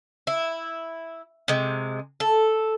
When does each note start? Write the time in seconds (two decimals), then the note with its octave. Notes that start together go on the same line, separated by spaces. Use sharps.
0.27 E4
1.48 C3 G#3
2.20 A4